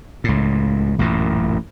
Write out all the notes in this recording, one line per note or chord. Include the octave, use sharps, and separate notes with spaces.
C#2 A2
A1 F#2 A#2